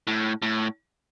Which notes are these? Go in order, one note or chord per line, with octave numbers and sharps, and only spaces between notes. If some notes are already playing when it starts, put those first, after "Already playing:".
A2
A2